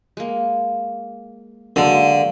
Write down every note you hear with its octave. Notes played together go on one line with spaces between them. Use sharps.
G#3 A#3
D3 F#3 G#3 A#3